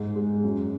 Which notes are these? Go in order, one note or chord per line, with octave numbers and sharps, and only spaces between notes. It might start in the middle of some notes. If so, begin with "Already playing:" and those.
Already playing: G#2
G#3
F#2